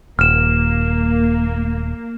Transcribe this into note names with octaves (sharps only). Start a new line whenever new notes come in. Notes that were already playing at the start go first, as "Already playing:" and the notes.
D#1 A#3 F6 E7